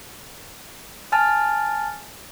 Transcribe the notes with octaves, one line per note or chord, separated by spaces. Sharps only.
G#5 A5 F6 A6